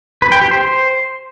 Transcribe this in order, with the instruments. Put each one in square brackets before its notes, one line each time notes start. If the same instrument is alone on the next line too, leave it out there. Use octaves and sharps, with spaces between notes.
[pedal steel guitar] B4
G5
G4
C5